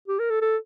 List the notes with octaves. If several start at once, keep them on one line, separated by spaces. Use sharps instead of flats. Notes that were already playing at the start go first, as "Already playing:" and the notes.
G4
A#4
A4
A4